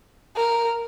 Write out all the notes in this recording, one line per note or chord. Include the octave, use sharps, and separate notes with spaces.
A#4